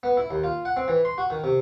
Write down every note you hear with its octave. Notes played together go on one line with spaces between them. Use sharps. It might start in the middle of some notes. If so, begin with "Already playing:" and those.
B3
E4
D#2
F4
F#5
C4
E3
C6
F#4
D#3
C3